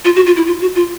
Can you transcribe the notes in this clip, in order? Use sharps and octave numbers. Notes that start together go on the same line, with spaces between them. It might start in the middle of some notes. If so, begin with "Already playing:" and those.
F4
F#4
F4
E4
F4
F#4
F4